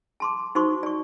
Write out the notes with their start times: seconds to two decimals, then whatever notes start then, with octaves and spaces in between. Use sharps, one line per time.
0.20 A5 C6 D6
0.55 D#4 F#4 C5 C6 C#6 D#6
0.83 D5 C#6